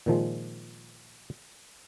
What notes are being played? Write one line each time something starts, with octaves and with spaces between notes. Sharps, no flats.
A#2 D#3 F3 G#3